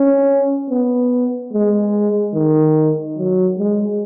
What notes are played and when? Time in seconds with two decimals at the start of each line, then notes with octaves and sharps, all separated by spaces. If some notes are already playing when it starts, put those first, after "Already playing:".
Already playing: C#4
0.70 B3
1.53 G#3
2.34 D#3
3.17 F#3
3.58 G#3